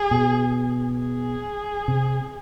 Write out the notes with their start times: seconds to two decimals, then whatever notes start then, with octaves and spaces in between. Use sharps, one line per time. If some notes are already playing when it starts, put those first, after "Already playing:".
Already playing: G#4
0.11 B2
1.00 G#4
1.88 C3